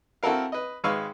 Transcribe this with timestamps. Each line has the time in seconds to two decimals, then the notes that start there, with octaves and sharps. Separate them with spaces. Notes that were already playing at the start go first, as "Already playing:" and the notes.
0.23 C4 E4 F#4 A4 A#4 F5
0.52 B4 D#5
0.84 G#1 G#3 B4 F5 C#6 E6